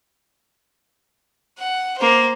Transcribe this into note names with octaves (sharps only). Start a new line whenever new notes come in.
F#5
A#3 C5